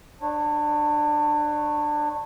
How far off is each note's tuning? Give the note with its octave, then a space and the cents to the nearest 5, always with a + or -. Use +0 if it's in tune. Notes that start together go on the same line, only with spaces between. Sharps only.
D4 +25 C#5 -20